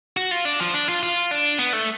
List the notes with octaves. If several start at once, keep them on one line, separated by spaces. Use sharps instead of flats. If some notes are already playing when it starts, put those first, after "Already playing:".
F#4
F4
D4
F3
D4
F4
F4
D4
B3
A3